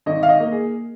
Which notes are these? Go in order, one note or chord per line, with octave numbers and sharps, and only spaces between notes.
G#1 D#5
F5
D#5
A#3
G#4